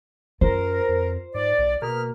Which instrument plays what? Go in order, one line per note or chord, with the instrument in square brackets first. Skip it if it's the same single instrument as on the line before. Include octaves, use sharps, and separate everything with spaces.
[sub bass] F#2 [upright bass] F4 [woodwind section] A#4 [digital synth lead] C5
[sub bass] F2
[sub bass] G#2 [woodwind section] D5
[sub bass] B1
[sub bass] B2 [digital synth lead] A#3 [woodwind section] G#4 B4 F6